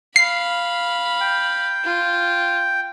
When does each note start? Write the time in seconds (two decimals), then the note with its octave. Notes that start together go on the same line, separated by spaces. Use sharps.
0.16 F5 B5 C7
1.21 G5
1.84 F4